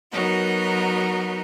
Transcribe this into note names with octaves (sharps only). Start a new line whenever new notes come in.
F#3 B3 D#4 F#4 A#4 D#5